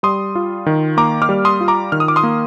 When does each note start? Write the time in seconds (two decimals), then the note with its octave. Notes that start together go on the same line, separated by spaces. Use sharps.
0.03 G3 C6 D#6
0.35 F4
0.66 D#3
0.97 A#3 A#5 D6
1.22 D6 F6
1.29 G3
1.45 C6 D#6
1.61 F4
1.68 A#5 D6
1.92 D#3 F6
2.00 D#6
2.08 D6
2.16 C6 D#6
2.23 A#3